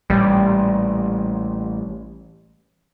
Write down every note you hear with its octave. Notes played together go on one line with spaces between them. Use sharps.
A1 A#2 G3